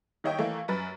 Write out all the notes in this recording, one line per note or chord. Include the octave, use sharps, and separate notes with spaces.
D#3 A#3 C#5 D#5 E5 G5
E3 A3 A#3
F#2 B4 A6